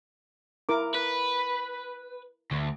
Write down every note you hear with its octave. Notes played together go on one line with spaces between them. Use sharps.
E4 A#4 D6
B4
D2